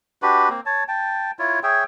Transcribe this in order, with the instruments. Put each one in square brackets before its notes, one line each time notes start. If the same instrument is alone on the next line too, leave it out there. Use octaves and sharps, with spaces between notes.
[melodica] D4 F#4 G4 B4
A#3 C4
C#5 A5
G5 A5
E4 F4 C#5
G#4 C#5 E5 G5